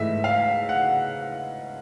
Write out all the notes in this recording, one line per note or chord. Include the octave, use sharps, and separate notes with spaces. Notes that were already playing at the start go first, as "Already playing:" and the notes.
Already playing: G#2 E3 A3 E5
F5
F#5